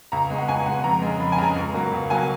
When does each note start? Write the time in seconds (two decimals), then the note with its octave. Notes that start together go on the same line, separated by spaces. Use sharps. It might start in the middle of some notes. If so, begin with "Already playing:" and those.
0.12 C#2 A#5
0.30 B2 G#3
0.38 F#5
0.48 C#2 G#5
0.66 B2 G#3 F#5
0.84 F2 A#5
1.02 C#3 G#3
1.20 F2 B5
1.32 G#5
1.38 C#3 G#3 A#5
1.56 C#2
1.74 B2 F#3 A#3
1.92 C#2
2.10 B2 F#3 A#3 G#5